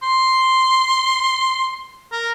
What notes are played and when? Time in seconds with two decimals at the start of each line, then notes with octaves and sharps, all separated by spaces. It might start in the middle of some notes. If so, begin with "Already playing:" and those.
0.03 C6
2.12 A#4